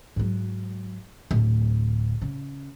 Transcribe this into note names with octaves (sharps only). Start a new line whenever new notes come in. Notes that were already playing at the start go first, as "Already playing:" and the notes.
G#2 F#3
D1
C#3